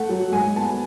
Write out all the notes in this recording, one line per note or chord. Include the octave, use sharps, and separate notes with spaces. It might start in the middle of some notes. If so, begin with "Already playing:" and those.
Already playing: A3 F#5
F#3
G#2 G#5
B3 A5